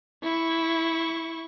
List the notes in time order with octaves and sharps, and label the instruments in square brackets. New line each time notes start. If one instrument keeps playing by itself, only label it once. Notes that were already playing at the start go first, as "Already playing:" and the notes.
[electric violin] E4 C#6